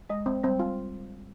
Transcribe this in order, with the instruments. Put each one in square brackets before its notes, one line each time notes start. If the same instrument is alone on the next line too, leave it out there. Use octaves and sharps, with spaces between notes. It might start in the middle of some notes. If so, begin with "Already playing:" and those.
[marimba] G#3 [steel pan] D#5
[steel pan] C4
[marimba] G3 [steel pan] C4
[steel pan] F4